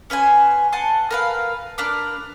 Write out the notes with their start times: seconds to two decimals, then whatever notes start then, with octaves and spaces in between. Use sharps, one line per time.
0.10 C#4 B4 C5 G#5
0.73 F#5 G#5 A5 C6
1.11 A#4 B4 F5
1.78 D4 A#4 B4 D6